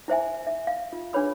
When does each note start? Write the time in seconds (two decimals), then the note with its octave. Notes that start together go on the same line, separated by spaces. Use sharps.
0.08 E4 C5 E5 G#5
0.47 E5
0.67 F5
0.93 F4
1.13 D4 G#4 B4 C#5 B5 E6